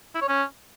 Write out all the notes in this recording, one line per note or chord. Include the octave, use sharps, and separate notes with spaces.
E4
C#5
C#4